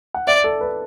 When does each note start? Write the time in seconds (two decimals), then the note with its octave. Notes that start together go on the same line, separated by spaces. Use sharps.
0.14 F#5
0.27 D5 E5
0.44 A4
0.61 B4